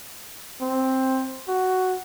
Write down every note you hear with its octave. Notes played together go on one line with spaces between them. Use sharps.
C4
F#4